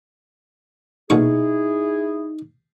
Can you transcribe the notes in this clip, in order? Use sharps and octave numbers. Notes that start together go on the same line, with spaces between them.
B1 A#2 D#4 E4 G#4 C#6